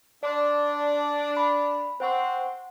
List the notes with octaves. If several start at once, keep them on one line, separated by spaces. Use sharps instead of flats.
D4 D5 C6
B5
C4 C5 F#5 C#6